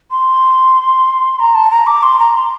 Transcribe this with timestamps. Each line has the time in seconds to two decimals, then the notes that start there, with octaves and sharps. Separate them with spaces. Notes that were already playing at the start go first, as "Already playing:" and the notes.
0.11 C6
1.40 A#5
1.55 A5
1.71 A#5
1.87 D6
2.03 C6
2.19 A#5
2.35 C6